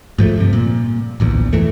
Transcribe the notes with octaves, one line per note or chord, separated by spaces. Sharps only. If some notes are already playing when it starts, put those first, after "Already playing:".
G#2 F3 G#3 A3
G2 C3
A#2
D1 A#1 E2
F2 E3 A3